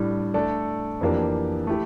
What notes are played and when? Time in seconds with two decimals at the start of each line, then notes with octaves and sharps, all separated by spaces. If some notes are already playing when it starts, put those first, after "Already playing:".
Already playing: A2 G3 D4
0.34 A3 D4 A4 D5
1.01 F2 E3 A#3 D4 G4
1.67 A3 E4 G4